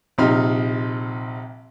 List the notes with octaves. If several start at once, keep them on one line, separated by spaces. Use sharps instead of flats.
A#1 C3 C4 D#4 F6